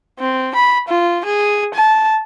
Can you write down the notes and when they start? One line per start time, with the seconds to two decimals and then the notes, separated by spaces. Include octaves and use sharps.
0.19 C4
0.55 B5
0.88 F4
1.25 G#4
1.74 A5